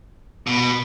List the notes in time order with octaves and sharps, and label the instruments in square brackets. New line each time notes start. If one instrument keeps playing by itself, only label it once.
[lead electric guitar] B2 [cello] B3